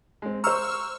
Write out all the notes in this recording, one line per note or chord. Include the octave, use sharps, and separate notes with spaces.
G#3 C4
C5 A#5 C#6 E6 F6